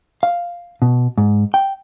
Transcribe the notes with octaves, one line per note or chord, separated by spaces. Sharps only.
F5
B2
G#2
G5